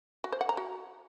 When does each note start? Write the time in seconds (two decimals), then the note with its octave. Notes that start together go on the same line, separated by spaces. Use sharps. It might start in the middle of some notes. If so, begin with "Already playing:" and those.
0.24 F#4
0.32 C5
0.41 F#5
0.49 A#5
0.57 F#4